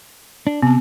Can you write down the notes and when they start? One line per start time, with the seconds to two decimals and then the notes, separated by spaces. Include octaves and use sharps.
0.47 D4
0.62 C3 B3 A5